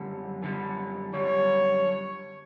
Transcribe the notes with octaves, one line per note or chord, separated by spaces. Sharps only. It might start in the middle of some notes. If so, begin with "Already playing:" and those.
Already playing: F#2 D3 G3
F#2 D3 G3
F#2 D3 G3 C#5